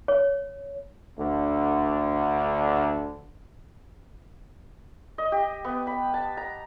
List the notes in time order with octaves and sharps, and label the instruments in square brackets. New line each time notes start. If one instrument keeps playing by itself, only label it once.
[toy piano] C#5
[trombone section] D2 D3
[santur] D#5
G4
B3
B5
A5
A#5